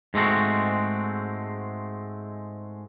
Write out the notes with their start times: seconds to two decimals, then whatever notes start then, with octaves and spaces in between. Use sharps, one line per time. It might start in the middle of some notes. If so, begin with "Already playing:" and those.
0.14 G#2 G#3 A3 C4 F#4